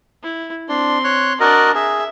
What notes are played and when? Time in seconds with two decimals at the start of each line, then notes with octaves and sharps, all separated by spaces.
0.23 E4
0.69 C4 D4 C6
1.04 C#5 F#6
1.40 D4 F#4 A#4 D5 D#5
1.75 G#4 E5